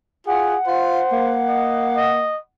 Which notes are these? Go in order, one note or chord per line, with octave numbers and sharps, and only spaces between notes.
F4 G#4 F#5
F4 C5
A#3
D#5
D#5